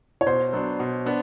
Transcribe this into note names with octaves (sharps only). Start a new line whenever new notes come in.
C#5
B2 C5
F#3 B3 D4
B2
B3 D4